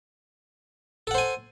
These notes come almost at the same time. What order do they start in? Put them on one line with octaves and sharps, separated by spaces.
A4 F#5 C5 G#5